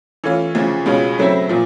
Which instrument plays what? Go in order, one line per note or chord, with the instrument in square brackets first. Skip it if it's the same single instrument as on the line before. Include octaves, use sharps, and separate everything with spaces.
[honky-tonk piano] E3 A3 C#4 F4
D2 C#3 F3
C#2 B2 G#3 C#4 F4
C#3 F#3 A3 C4 E4
A#2 F3